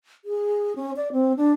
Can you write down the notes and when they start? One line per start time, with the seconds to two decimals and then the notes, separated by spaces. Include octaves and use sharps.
0.25 G#4
0.76 C#4
0.96 D5
1.12 C4
1.37 D4